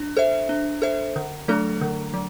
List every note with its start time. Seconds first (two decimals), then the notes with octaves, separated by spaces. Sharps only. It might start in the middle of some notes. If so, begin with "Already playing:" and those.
Already playing: D4
0.17 A4 C5 E5
0.49 D4
0.82 A4 C5 E5
1.16 D3
1.48 F#3 A3 D4 A4
1.81 D3
2.14 F#3